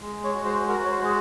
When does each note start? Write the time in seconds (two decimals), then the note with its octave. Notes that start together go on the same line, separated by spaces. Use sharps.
0.01 G#3
0.24 C#5
0.34 F#4
0.45 C5
0.68 F#4 A#4
0.85 C#5
0.91 C5
1.01 G#3 G#4